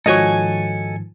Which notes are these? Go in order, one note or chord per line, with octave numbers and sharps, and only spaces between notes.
G#2 D#3 F3 F#4 A4 C#5 D#5 G#5